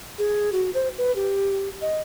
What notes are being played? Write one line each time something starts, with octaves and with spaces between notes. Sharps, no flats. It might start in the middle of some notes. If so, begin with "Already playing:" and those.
G#4
F#4
C5
B4
G4
D#5